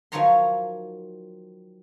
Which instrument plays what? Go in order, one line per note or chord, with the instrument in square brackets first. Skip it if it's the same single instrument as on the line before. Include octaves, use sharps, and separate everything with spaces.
[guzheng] D#3 F3 F#3 C#5 A#5 C6